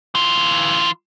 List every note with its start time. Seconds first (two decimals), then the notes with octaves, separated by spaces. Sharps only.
0.15 E3 F4